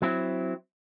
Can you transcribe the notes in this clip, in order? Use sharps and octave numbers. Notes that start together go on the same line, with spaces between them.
F#3 C4 E4